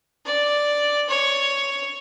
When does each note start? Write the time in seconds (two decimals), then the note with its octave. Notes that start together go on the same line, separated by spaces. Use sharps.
0.26 D5
1.09 C#5